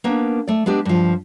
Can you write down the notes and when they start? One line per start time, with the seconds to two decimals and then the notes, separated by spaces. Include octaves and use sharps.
0.04 A#3 B3 C#4 D4 A#4
0.47 A3 D5
0.66 G#3 B3 D4 G4
0.85 G2 F3